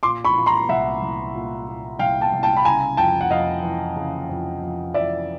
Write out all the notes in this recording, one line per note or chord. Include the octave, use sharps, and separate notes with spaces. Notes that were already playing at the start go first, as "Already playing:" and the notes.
A#2 C6 D6
B5 C#6
A#2
A#5 C6
C2 E5 F#5
C2
A#2
A#2
C2 F5 G5
G5 A5
C2
G5 A5
B5
C#3 G#5 A#5
F2 G5 A5
F#5
F2 D#5 F5
E3
C#3
F2
F2
E3 D5 E5